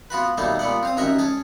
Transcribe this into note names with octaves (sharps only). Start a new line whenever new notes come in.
B3 F4 F#4 B4
B2 D#3 G3 A3 A#3 A4
A#2 B3 D5 F#5
C4 F5 D#6
A1 D#3 C#4 F#4 A#4 E5
C#4 G#4 A5